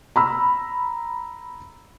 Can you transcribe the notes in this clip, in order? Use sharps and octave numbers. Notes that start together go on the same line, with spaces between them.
A#5 B5 E6